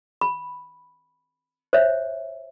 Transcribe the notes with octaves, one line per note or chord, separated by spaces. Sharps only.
B5
C5 C#5 E5